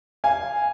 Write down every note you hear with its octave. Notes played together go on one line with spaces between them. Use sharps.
F5 G#5